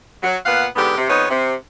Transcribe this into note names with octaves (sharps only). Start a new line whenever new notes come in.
F#3
A#2 B3 F5 F#5
G#2 D3 B3 G4
C3
F2 B3 D#4 C#5
C3